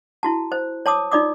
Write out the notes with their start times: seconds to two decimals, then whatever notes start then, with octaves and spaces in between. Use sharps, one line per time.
0.23 E4 F#4 A5
0.52 C5
0.86 C#5 A5 D6 D#6
1.12 D#4 F4 D5 D6 D#6